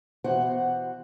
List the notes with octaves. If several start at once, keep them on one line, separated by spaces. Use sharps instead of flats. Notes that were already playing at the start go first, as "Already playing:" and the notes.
B2 E3 F#4 C5 F#5